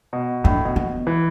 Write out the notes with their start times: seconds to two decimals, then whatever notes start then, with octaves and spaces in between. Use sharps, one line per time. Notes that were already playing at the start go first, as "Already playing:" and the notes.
0.13 B2
0.44 A2 D4
0.65 B2
0.76 B3
1.07 E3